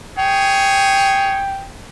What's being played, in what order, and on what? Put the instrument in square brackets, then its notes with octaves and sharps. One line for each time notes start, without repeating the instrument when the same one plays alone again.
[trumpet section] G#4 C#5 [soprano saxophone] G5